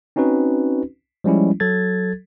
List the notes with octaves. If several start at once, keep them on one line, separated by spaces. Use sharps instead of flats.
C4 C#4 D#4 F#4 B4
F3 G3 G#3 C#4 E4
F#3 A4 G#6 A6